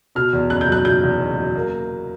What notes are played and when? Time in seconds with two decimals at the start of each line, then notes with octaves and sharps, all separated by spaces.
0.15 B2 F6
0.33 E2
0.50 F#1 F#6
0.61 G6
0.68 F#3 F#6
0.85 B2 G6
1.03 E2
1.20 F#1
1.38 F#3
1.55 A#3